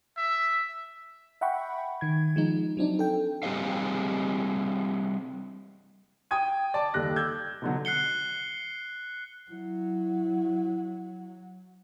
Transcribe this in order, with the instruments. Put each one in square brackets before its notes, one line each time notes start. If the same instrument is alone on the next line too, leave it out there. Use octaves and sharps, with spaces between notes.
[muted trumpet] E5
[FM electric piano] E5 F#5 G5 B5 C#6
D#3 G#6
F3 G#3 D#4
F#3 C4 D4 D#4
A4 G5
[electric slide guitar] G3 C4 G4 G#4 D#5 F5
[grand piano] G5 D#6 G#6 D#7
D5 A5
D#2 G3 A4 F#6 A#6
D6 E6 G6 G#6
B2 D3 F#3
[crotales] F#6 C7 C#7 G7
[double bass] F#3 [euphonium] E4